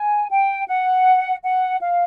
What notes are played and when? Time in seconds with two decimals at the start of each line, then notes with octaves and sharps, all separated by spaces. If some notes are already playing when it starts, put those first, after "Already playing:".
Already playing: G#5
0.30 G5
0.68 F#5
1.43 F#5
1.81 F5